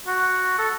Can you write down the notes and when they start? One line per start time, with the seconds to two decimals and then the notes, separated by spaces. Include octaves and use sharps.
0.07 F#4
0.58 A4